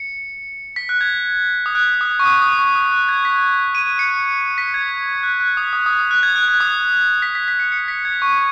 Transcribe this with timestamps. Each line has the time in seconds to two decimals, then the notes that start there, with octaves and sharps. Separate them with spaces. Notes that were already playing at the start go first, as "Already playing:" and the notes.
Already playing: C#7
0.76 B6
0.89 F#6
1.01 G#6
1.66 D#6
1.75 F#6
2.01 D#6
2.19 C#6
2.26 D#6
2.42 D#6
2.59 C#6
2.76 D#6
2.91 F#6
3.09 G#6
3.25 B6
3.75 D#7
3.99 C#7
4.58 B6
4.74 G#6
5.23 F#6
5.40 F#6
5.57 D#6
5.73 D#6
5.86 D#6
5.99 D#6
6.11 F#6
6.23 G#6
6.36 F#6
6.48 F#6
6.60 D#6
7.22 B6
7.35 B6
7.48 B6
7.59 C#7
7.72 C#7
7.88 B6
8.05 G#6
8.22 C#6